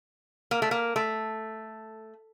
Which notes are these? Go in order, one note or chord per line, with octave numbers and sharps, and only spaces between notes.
A#3
A3
A#3
A3